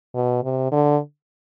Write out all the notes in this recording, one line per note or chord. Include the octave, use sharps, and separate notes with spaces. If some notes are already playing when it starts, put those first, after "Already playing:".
B2
C3
D3